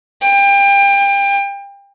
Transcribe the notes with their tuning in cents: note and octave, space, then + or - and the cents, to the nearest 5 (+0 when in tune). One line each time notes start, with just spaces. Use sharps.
G5 +30